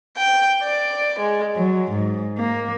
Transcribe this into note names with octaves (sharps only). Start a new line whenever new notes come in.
G5
D5
G#3
F#3
G#2
A#3